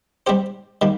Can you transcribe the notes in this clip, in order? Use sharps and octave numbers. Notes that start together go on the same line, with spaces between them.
G3 C4 G4 C5
D#3 G3 A#3